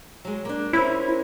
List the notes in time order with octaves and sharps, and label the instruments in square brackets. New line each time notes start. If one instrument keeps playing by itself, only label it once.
[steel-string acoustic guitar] F#3 G#3
A#3 D4
[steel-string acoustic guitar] C#4 A#4 C5 [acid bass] E4